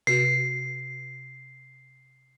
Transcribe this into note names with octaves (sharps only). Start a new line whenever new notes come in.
C3 F#4 C7